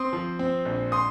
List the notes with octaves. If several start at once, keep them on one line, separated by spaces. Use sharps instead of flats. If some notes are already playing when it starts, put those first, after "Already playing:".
Already playing: C4 C6 D#6
F3
C4
A#1
C6 D#6